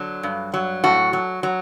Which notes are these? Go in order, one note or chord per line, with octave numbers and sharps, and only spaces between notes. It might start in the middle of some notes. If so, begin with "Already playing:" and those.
Already playing: D3 F#3
G2
F#3
A2 F#4
F#3
F#3